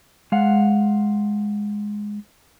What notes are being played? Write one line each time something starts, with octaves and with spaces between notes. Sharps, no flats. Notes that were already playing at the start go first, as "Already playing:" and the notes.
G#3 F5 F#5